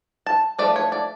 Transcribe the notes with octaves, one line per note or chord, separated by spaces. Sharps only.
A5
F3 A3 D5
C#5
D5